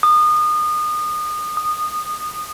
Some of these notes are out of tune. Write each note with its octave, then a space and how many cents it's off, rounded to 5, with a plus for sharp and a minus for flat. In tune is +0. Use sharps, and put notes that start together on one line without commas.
D#6 -30
D#6 -20